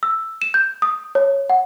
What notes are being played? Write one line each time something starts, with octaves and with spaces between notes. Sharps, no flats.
E6
E7
G6
D#6
C#5
F#5